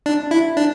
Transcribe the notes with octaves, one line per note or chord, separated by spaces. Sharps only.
D4
E4
D4